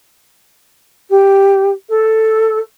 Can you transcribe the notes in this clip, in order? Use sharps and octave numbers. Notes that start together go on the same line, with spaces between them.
G4
A4